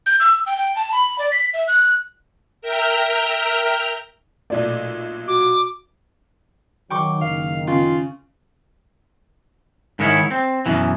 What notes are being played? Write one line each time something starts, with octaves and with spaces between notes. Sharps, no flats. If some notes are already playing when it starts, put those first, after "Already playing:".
G6
E6
G5
G5
A5
B5
D5
B6
E5
F#6
A#4 E5 G5 A#5 F6
B1 A#2 A3 D5
F#4 D6
D#3 F#3 G5 C#6 D6
F#1 D#3 F5
C#3 F4
G#2 D#3 E4 A#4 C#5
C4
F#2 B2 E3